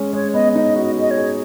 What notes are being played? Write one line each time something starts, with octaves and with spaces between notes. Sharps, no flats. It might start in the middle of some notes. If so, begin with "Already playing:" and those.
Already playing: G#3 C#4
G#3 C#5
B3 D#5
D#4 D#5
F#4
D#5
G#4 D#5
C#5
G#4